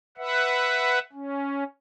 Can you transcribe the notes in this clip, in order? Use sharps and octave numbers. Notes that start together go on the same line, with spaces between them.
B4 E5 F#5
C#4